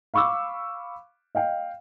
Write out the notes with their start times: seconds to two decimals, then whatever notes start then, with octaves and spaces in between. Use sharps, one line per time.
0.14 F5 B5 C#6 D6 E6
1.35 D#5 F5 G5